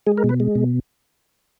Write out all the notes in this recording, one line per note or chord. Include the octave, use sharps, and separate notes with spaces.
G#3 G#4
A#4
B2
B4
G#3
B2